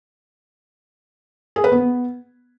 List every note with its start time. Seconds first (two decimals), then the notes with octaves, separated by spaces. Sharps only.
1.56 G#4
1.64 B4
1.72 B3